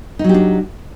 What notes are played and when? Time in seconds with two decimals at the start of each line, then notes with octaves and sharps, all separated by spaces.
0.19 D#4
0.24 F#3
0.29 G4
0.34 D4